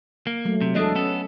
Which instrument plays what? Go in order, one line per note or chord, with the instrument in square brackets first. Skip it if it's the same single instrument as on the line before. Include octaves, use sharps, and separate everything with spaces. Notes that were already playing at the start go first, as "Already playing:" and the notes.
[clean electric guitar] A#3
[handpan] F#3 A3
[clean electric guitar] C3 [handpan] F#3
[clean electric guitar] E2 G#3 D4 [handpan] A4 D#5
[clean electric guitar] B3 A4 [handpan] C#4